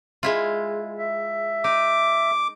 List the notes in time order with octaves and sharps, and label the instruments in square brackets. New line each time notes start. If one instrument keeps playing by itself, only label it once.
[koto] G#3 E4 F4
[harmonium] E5
[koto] D#4 [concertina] D6